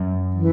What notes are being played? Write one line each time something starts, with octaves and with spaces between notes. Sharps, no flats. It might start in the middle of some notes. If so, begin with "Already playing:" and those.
Already playing: F#2
E3